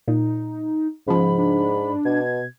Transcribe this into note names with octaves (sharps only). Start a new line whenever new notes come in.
A#2 D#4
G#2 C#3 F3 B5
D4 B5
B2 G#6